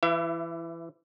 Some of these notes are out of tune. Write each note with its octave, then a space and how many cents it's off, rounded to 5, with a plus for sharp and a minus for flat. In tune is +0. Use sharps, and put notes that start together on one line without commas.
E3 +20 E4 +0 E5 +45